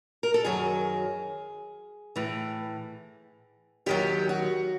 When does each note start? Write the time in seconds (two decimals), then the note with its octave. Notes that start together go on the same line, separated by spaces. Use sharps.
0.23 A#4
0.34 A4
0.44 F#2 D#3 F#3 G#4
2.16 A2 E3
3.86 D#2 D#3 F#3 G4
4.29 F#4